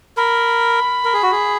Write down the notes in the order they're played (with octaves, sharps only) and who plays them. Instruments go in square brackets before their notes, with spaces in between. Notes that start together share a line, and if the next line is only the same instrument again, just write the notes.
[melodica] A#4 [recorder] B5
[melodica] A#4
G#4
F#4
G#4